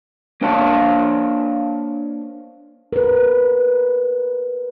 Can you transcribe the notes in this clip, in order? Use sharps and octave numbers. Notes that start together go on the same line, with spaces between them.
A#3 D4 C5 C#5 F5 A5
A#4 B4